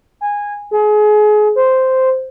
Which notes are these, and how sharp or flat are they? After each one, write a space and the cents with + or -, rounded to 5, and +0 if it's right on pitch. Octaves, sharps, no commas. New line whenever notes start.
G#5 -15
G#4 +30
C5 -5